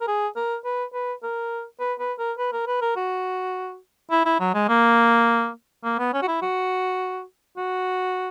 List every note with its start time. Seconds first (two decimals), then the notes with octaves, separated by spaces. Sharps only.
0.01 A#4
0.07 G#4
0.36 A#4
0.64 B4
0.93 B4
1.23 A#4
1.80 B4
2.00 B4
2.19 A#4
2.38 B4
2.52 A#4
2.67 B4
2.81 A#4
2.96 F#4
4.11 E4
4.26 E4
4.40 F#3
4.54 G#3
4.69 A#3
5.84 A#3
5.99 B3
6.13 C#4
6.22 F#4
6.28 E4
6.42 F#4
7.57 F#4